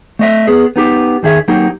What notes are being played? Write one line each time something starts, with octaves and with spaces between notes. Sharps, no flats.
A3 D#5 E5
B3 G#4
B3 D#4 G4
D#2 D#3 G#4 E5
F#3 A#3 D#4 G4